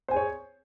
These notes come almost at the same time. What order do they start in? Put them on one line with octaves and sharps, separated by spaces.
C5 G#5 G#4 C#5